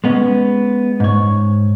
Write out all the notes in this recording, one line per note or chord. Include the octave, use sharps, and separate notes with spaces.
G#3 B3 C#4
G#2 C#5